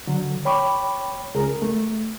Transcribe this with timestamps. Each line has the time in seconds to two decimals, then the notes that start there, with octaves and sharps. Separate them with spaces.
0.07 D3 F#3
0.45 C#5 G5 B5 C#6 D6
1.34 C#2 G#4 A#4 A#5
1.62 A3